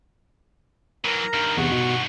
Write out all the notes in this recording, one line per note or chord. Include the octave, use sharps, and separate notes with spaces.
E3 F#3 A#4 A#5
G2 D#3 F6
E2 C3 F#5 C#6
B2